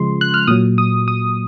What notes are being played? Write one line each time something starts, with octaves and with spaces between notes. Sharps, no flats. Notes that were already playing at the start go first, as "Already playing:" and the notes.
Already playing: C#3 F3 G#3 C6
F#6
F6
A#2 F#3 D#6
D#6
D#6